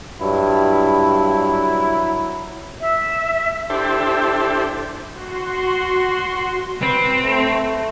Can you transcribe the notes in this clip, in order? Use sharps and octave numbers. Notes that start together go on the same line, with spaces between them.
G2 F#3 E4
E5
D4 E4 G4 A4 C5
F#4 C6
C4 B4
A3